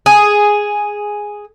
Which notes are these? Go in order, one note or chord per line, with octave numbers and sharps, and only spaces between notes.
G#4